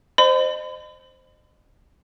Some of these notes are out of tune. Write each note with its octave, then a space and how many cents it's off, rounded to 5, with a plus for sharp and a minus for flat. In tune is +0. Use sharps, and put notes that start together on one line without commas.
C5 +0 D#5 -35 B5 +45